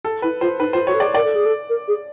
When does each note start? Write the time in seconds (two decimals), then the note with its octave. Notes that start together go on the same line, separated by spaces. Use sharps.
0.05 A4
0.22 E4 B4
0.41 F4 C5
0.60 D#4 B4
0.73 F4 C5
0.87 F#4 C#5
0.94 A4
1.00 G#4 D5
1.14 A#4 D5
1.25 A4
1.35 G#4
1.46 A4
1.69 A#4
1.88 G#4